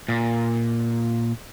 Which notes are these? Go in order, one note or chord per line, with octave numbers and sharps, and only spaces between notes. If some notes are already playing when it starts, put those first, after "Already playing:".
A#2